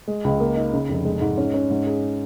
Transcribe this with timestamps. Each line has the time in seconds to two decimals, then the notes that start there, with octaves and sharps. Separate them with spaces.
0.08 G#3
0.24 C#2
0.40 A#3
0.56 D#4
0.73 C#3
0.89 F1
1.05 G#3
1.21 G#2
1.38 C#4
1.54 C#4
1.70 G#2
1.86 G#4